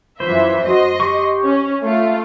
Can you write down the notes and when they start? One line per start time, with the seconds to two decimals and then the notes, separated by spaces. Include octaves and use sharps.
0.20 F#2 E3 F4 C5 E5
0.66 F#4 D#5 C6
1.00 G4 C#6
1.43 C#4
1.82 A3 F4 E5